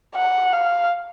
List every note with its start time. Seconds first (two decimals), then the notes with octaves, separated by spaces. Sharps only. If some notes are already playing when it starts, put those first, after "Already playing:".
0.15 F#5
0.53 F5